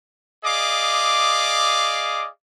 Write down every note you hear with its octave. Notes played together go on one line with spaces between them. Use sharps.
G#4 D5 D#5 F5 D6